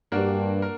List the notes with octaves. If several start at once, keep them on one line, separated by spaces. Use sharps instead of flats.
G2 A#3 D4 F#4 A#4
A#4